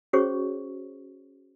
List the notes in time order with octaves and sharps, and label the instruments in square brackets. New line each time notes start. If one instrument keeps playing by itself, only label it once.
[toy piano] C#4 F#4 G#4 C5 C#5 C#6